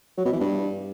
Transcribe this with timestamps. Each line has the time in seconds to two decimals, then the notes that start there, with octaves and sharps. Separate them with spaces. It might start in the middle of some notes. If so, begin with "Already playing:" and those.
0.18 F#3
0.25 B2
0.33 E3
0.40 G2